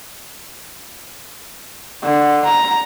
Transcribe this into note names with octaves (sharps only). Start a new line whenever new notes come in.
D3
A#5